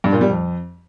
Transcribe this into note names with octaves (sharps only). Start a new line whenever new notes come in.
G2
A#2
G3
F2